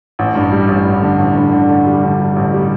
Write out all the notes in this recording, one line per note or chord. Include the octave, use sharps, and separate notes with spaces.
A1
G2
G3
A1
A1
D3
A1
G2
D3
D3
G3
D3
G3
A1
G3